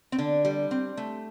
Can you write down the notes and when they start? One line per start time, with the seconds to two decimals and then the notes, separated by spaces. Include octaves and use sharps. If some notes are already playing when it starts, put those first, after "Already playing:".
0.12 C4
0.18 D3 D4
0.45 G3
0.71 C4
0.97 A3